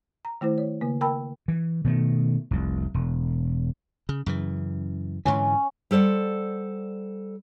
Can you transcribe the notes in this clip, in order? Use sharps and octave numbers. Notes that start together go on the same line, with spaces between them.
A#5
D#3 A3 E4 C5
C#5
C#3 A#3
A#4 G5 A5 B5 E6
E3
B2 D#3 A3
F1 C2
E1
C#3
F#2 C#3 E3
G#2 D3 E3 C#4
G3 A4 C5 D5 F#5